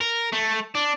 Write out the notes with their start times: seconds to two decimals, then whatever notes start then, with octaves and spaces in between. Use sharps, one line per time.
0.01 A#4
0.32 A3
0.75 D4